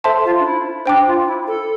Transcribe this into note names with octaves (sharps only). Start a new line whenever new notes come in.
A4 C5 E5 A5 C6
F4
D4
E4
D4 C5 G5 D6
F4
E4
A4